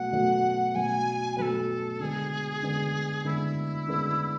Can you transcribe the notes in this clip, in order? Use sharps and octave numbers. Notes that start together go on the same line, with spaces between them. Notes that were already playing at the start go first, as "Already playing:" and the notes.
Already playing: B2 F#3 A3 F#5
B2 F#3 A3
B2 F#3 A3 G#5
B2 F#3 A3 A4 B4
D3 G#3 B3 G#4
D3 G#3 B3
D3 G#3 B3 E4
D3 G#3 B3